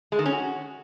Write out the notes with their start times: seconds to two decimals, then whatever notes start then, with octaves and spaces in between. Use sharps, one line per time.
0.12 G#3
0.19 D#3
0.26 C#4
0.32 F#4